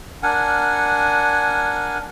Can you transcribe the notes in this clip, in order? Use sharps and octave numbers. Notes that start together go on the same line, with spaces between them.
D4 A#4 F#5 G#5